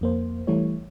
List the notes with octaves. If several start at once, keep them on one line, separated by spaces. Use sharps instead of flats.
F2 A#3 C5
E3 G3 A3 E4 C#5